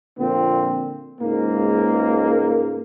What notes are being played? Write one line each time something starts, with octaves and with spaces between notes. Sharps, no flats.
A#2 D3 F3 C4
C#2 G#2 A#3